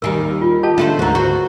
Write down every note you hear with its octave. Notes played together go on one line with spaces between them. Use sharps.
D#2 D#3 G3 A#4 G#5 E6
F4
G4 D#5 A5
D3 A3 D4 A4 B4 C5 F5
D2 G#2 D3 F#4 A#4 A#5
F#4 C5